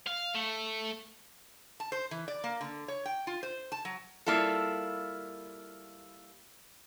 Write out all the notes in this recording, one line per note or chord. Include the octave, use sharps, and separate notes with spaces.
F5
A3
A5
C5
E3
D5
A#3
D3
C#5
G5
F4
C5
A5
F#3
G3 A#3 E4 F4 A4